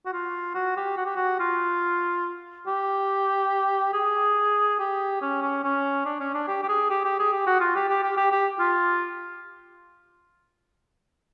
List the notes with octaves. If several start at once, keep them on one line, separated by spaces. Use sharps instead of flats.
F#4
F4
F#4
G4
F#4
G4
F#4
F4
G4
G#4
G4
C#4
C#4
C#4
D4
C#4
D4
G4
G4
G#4
G4
G4
G#4
G4
F#4
F4
G4
G4
G4
G4
G4
F4